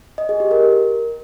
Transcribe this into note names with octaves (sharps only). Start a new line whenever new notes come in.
D#5
G#4
G4
A#4